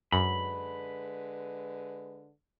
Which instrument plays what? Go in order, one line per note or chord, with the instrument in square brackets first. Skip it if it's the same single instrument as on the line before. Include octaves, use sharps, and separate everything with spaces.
[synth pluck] F#2 [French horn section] D3 G#3 B4 [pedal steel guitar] B5